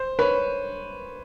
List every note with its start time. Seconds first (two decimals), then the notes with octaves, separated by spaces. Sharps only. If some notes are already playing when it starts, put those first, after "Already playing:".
Already playing: C5
0.19 B4 C#5